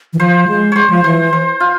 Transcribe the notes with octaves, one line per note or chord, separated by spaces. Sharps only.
E3
F3 C5
G#3
G#3 C5 C#5
F3
E3 C5
C5
F4